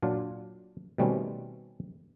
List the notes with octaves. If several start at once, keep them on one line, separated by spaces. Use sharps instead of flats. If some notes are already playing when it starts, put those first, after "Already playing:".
A#2 F#3 D4 F4
B2 D#3 G3 A3 C4 C#4